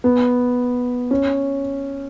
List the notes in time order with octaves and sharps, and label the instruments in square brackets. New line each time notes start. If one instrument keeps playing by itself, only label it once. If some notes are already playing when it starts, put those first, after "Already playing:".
[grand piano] B3
C#4